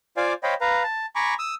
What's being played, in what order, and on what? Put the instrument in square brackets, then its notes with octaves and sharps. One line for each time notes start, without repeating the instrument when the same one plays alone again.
[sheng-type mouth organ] F4 C5 D5 F5 G#5 D6
C5 C#5 D#5 F5 G5 B5
B4 F5 A#5
A5
G#5 A#5 B5 C#6 D6
D#6 E6